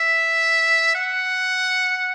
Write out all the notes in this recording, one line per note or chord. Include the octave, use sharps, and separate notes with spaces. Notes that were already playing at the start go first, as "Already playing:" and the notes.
Already playing: E5
F#5